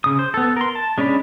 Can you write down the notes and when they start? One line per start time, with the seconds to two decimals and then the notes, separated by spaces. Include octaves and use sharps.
0.04 C#3 D#6
0.19 C5
0.34 B3 A4
0.56 A#4 C6
0.75 A5
0.98 G#3 C#4 D4 D5 B5